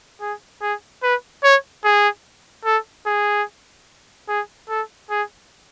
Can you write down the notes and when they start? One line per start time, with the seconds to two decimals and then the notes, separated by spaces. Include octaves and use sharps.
0.21 G#4
0.62 G#4
1.03 B4
1.44 C#5
1.84 G#4
2.65 A4
3.07 G#4
4.29 G#4
4.69 A4
5.10 G#4